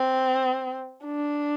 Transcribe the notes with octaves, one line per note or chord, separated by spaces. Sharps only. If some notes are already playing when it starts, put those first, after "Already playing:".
Already playing: C4
D4